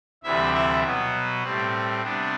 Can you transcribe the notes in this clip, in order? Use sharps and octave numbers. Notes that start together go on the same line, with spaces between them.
D2 C3 E3 G3 E4 E5
E4 E5
B2 F#3 B3
A2 G3 C4
C3 G3 B3 D4